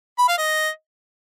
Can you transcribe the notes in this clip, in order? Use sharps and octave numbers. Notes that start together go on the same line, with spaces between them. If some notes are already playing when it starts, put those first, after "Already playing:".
B5
F5
D#5